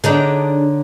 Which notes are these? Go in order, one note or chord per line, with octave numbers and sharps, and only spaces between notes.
D3 D4 D#4 G#4 C#5 A#5